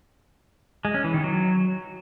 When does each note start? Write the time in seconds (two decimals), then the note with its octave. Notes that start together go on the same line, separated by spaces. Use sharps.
0.85 G#3
0.94 C#4
1.04 E3
1.14 D#3
1.24 F#3